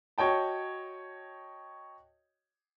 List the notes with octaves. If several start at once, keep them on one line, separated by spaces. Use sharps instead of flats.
F#4 C#5 D#5 G5 A5